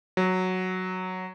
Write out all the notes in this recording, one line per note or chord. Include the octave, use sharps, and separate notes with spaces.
F#3